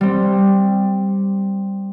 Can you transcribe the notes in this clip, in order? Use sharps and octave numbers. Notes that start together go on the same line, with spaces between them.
G3 C4